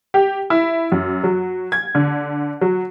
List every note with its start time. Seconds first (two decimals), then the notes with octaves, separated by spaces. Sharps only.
0.14 G4
0.50 E4
0.92 F#2
1.24 F#3
1.72 G#6
1.95 D3
2.61 F#3